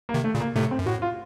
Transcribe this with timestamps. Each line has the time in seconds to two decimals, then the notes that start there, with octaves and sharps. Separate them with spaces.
0.09 A#3
0.14 C3 D#3
0.24 A3
0.35 A#2 C#3
0.40 A#3
0.56 A2 C3 A3
0.71 C4
0.79 F#2
0.86 A2 F#4
1.02 F4